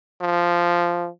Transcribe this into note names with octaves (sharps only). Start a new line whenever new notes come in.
F3